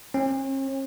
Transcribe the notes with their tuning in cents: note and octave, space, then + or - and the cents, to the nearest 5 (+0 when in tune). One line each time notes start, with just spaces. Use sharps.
C#4 -45